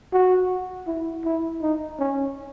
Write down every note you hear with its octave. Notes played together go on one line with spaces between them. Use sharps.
F#4
E4
E4
D#4
C#4